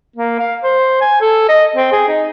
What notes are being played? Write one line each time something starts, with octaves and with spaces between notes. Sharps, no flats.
A#3
F5
C5
G#5
A4
D#5
C4
G#4
D#4